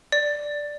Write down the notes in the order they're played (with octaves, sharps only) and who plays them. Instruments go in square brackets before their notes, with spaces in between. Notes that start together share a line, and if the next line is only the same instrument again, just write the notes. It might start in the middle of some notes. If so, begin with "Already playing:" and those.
[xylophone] D5